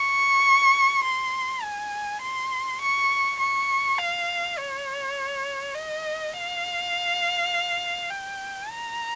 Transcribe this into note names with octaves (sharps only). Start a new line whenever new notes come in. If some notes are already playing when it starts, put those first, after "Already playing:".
Already playing: C#6
C6
G#5
C6
C#6
C#6
F5
C#5
D#5
F5
G5
A#5